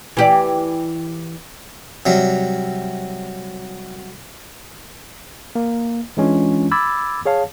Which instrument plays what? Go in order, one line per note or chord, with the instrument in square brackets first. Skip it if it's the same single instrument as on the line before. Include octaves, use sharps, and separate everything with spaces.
[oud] E3 G4 D5
[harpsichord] C3 F#3 G3
[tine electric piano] A#3
E3 G#3 C#4 D4 F4
B5 D6 E6 G#6 A6
G#4 C#5 F5 A5